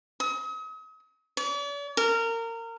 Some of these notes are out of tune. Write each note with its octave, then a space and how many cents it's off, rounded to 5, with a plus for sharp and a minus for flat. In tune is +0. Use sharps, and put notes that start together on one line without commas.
D#6 +40
D5 -45
A#4 -25